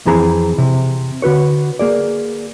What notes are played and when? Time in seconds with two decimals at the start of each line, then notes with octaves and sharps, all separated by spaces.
0.06 F2 E3 C4 G#4 A#5
0.58 C3
1.22 D3 F#4 B4 C#5
1.79 A#3 G#4 D5